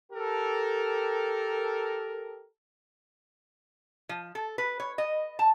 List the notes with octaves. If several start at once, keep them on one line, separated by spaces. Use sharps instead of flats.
G4 A4 A#4
F3
A4
B4
C#5
D#5
A5